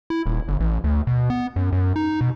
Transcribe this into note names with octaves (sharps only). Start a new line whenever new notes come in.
E4
D#1
G1
A1
D2
B2
B3
F#2
F#2
D#4
B2